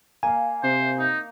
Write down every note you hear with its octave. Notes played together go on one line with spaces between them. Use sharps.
A#3 F5 G#5
C3 C5 E5
D#4